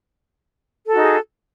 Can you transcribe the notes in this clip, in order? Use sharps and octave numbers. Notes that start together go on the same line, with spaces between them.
D#4 F#4 G#4 A4